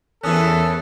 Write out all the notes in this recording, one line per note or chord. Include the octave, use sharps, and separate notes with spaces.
E2 E3 C#4 A4 A#4 D#6 F#6